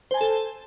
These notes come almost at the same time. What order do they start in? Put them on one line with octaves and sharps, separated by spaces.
C5 G#5 A5 A4